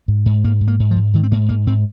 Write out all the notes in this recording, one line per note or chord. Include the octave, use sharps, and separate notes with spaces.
G#2
G#2
G#2 A#3
G#2
A#3
G#2
F3
G#2
G#2 D#3
C4
G#2 A#3
G#2 A#3
G#2 C4